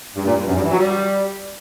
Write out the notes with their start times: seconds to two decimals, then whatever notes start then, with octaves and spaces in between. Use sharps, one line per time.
0.16 G2
0.25 A#2
0.35 G2
0.47 F#2
0.55 G2
0.63 E3
0.71 F#3
0.78 G3